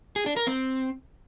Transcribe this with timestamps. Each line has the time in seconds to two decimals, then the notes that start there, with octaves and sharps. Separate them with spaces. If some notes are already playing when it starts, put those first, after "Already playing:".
0.16 G#4
0.26 D4
0.37 A#4
0.47 C4